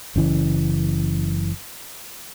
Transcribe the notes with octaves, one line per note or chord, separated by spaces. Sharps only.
F#1 C#3 E3